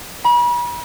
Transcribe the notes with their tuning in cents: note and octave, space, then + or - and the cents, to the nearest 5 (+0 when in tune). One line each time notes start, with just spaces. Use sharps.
B5 -40